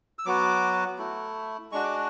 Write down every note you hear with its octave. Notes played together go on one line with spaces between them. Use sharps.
E6
F#3 B3 F#4 D6
A3 E4
G#3 D4 F#4 C#6
D6